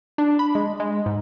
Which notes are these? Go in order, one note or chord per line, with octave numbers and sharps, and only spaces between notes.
D4
B5
G#3
G#3
G#2